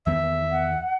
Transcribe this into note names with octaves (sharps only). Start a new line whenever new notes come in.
E2 D#3 B3 E5
F#5